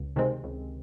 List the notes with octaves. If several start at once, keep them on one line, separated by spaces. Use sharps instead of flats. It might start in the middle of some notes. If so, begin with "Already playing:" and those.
Already playing: C#2
C3 D#3 G#3 C4
C#2